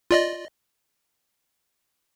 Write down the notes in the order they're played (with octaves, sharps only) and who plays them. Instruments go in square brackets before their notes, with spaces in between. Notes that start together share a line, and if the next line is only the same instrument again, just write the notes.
[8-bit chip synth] F4 D5 D#5